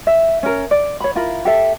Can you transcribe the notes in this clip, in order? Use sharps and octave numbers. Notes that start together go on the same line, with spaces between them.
E5
C#4 A#4
D5
C#5 B5
E4 F4 A#4 B5
G4 A4 E5